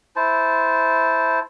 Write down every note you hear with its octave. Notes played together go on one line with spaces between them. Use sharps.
E4 C5 A5